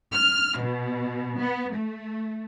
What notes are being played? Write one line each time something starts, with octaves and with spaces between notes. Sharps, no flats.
F6
B2
B3
A3